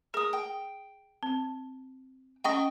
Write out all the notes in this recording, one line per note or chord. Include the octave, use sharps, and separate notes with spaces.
G#4 A#4 D#6
G5
C4
C#4 D#5 F#5 G5 C#6 D#6